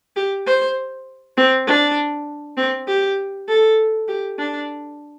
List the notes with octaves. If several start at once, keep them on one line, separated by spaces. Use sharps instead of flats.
G4
C5
C4
D4
C4
G4
A4
G4
D4